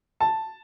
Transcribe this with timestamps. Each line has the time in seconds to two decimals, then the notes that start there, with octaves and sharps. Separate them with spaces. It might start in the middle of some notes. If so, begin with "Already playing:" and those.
0.20 A5